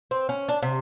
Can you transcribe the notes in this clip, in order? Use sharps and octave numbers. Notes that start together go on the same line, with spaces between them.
C4
C#4
D4
C3